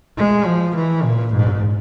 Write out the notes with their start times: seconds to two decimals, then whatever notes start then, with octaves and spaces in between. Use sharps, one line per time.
0.17 G#3
0.45 F3
0.75 E3
1.04 A#2
1.33 G#2